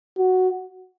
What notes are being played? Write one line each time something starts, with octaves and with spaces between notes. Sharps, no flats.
F#4